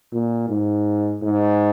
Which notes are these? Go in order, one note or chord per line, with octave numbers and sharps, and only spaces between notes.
A#2
G#2
G#2